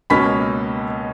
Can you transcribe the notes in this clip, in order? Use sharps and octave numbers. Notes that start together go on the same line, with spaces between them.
C#2 B2 A#3 C#4 B5 B6